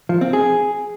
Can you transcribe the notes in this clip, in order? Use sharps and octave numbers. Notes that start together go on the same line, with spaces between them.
F3
C4
G#4